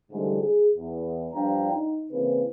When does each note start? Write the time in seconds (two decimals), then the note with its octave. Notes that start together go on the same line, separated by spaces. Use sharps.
0.11 G#2 D3 E3 F3 G3 A3
0.41 G#4
0.76 E2
1.33 G2 F3 D4 F5 G5 A#5
1.71 D#4
2.12 C#3 E3 A#3 C4 E4 B4